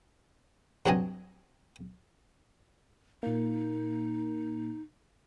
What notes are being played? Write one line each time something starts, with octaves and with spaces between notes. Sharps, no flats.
G2 F#3 C4 D4 D#5 G#5
A#2 A#3 D#4